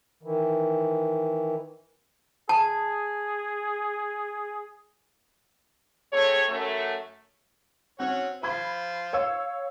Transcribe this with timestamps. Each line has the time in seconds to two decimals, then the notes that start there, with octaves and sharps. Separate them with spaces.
0.23 D#3 E3
2.49 G#4 A5
6.13 A3 C4 G#4 C#5
6.48 F#2 A3
8.00 C4 C#4 F#4 C#5
8.43 F4 C5 B5 G#6
9.13 C#5 F5 E6